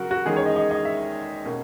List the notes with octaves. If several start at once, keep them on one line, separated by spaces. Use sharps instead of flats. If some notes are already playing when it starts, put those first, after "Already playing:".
Already playing: C#3 F#3 A#3 F#4 A#4
F#4
E2 D#3 G#3 C#4 G#4
C#5
D#5
D#5
D#5
E5
B2 A#3 C#4